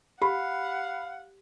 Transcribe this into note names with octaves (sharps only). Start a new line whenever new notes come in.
G4 F5 F#5 B5